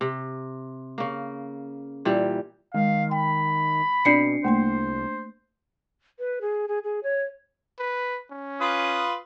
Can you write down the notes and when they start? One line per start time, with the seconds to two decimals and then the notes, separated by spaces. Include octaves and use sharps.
0.01 C3
0.98 C#3 A#3
2.05 A#2 E3 G3
2.74 D#3 G#3 F5
3.11 G5 B5
4.05 B2 C4 D4 D5 C7 C#7
4.45 C2 A3 A#3 C5 C6
6.19 B4
6.41 G#4
6.68 G#4
6.84 G#4
7.03 C#5
7.79 B4
8.31 C#4
8.61 F4 B4 D#6